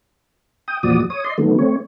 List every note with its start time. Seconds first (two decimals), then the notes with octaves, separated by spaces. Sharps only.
0.68 G5 D#6
0.83 E2 A#2 F3 F#4 D5 D#6
1.10 C#5 D#6
1.24 D5 D#5 C6
1.38 D3 D#3 F#3 A3 B3
1.59 A3 C4 C#5